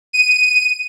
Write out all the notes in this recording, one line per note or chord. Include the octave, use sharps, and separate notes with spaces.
D#7